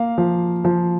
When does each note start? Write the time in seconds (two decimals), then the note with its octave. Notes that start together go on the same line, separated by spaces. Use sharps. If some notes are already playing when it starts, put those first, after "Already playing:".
Already playing: A#3 F5
0.18 F3
0.65 F3